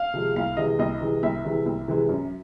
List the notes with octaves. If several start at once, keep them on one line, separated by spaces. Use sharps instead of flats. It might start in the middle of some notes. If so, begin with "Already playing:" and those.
Already playing: F5
C3 F3 G#3
C2 F5
C3 E3 G#3 D#5
C2 D#5
C3 E3 G#3
C2 E5
C3 E3 G#3
C2
C3 E3 G#3
F#2